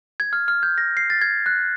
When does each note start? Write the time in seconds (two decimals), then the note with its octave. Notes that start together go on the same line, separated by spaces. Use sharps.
0.20 G#6
0.33 F6
0.48 F6
0.63 G6
0.78 A#6
0.97 C7
1.10 A6
1.21 G#6
1.46 F#6